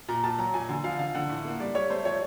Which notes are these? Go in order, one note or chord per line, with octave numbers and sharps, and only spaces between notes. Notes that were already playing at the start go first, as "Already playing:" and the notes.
A#2 A#5
A#2 A5
F#3 A#5
A#2 G#5
D3
F3 F5
D3 F5
D3 F#5
A2
A#3
G3 D5
G3 C#5
A3 C5
F3 C#5